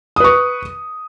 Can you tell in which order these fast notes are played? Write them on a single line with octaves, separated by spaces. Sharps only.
D#6 B4 C#6